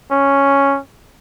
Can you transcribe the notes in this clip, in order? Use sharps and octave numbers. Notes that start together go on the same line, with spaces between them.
C#4